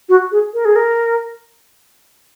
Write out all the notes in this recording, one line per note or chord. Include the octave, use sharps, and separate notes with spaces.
F#4
G#4
A#4
G#4
A#4